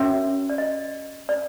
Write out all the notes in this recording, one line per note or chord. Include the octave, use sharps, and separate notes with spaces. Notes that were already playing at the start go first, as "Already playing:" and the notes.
Already playing: C#4 F#4 A#4 C#5 E5
D5
D#5
D5